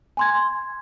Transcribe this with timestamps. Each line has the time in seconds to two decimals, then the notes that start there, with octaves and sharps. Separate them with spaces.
0.17 G#5 C6 G#6